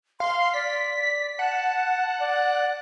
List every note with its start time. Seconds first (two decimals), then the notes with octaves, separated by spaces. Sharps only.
0.20 F5 C6
0.54 D5 B6
1.39 F#5 A5
2.20 D5